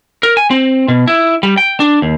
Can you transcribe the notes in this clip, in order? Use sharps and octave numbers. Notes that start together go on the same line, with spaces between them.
A#4
G#5
C4
B2
E4
G3
G5
D4
D#2